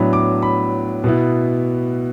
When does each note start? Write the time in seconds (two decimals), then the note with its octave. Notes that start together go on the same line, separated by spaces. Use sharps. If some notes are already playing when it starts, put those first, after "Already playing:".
Already playing: A2 F#3 B3 D4 B5
0.13 D6
0.43 B5
1.04 B2 B3 E4